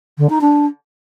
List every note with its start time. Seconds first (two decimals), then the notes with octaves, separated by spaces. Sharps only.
0.18 D3
0.30 D#4
0.41 D4